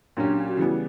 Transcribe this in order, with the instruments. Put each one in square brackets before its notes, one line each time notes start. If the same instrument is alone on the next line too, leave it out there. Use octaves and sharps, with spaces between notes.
[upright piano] A#2 F#3 C#4 G4 [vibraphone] D4
[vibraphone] F#4
[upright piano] C#3 E3 G3 B3 [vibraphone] E4